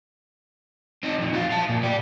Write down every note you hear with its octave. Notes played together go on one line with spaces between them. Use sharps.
C4 D#4
F2 A#2
F#4 F5
F5 A5
A#2
D5 G5